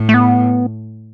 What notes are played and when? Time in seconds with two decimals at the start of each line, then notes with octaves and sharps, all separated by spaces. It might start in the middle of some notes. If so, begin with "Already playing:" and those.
Already playing: A2
0.09 A3
0.14 B3